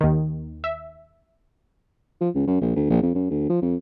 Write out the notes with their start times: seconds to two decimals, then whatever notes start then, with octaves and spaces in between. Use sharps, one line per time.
0.01 D#2 D#3
0.64 E5
2.20 F3
2.35 C#2
2.47 F#2
2.61 A#1
2.75 D2
2.90 A#1
3.02 F2
3.15 F#2
3.30 D2
3.49 F3
3.62 F2